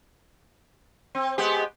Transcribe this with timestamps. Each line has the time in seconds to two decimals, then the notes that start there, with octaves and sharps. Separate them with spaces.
1.15 C4
1.38 G#3 B3 G4